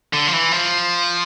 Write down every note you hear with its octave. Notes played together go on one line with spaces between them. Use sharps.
D3
F3
E3
F3